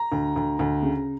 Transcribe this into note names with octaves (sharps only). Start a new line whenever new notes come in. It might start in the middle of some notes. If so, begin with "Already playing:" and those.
Already playing: A#5
D2
D2
D2
C#3